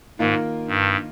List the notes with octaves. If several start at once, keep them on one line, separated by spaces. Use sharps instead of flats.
G#2 D#3 A#3 F4 A#4
G2